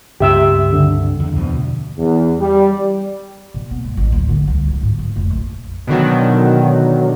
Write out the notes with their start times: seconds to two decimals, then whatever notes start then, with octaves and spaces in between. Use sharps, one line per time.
0.20 C#2 G2 C4 G4 E5 E6
0.73 D3
1.20 E2
1.36 D2 B2 F3
1.97 E2
2.39 G3
3.54 B2
3.71 B3
3.84 G2
3.97 A1
4.12 D1
4.29 D3
4.48 C2
4.68 D2
4.83 G#2
4.99 F2
5.16 F1
5.30 A#1
5.87 B2 D3 D#3 F#3